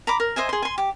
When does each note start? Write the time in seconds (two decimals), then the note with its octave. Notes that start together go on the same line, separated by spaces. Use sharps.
0.07 A#5 B5 D6
0.20 A#4
0.36 C5 D#5 E5 G#5
0.49 G#4 C6
0.62 G#5 C6
0.78 G4